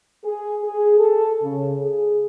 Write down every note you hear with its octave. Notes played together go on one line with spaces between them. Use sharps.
G#4
G#4
A4
C#3
G#4